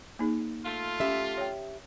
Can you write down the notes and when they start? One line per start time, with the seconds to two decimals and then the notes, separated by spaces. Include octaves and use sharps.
0.19 A#3 D#4 G#4
0.64 A3 F4
1.00 C#4 G4 E5
1.37 C#5 G5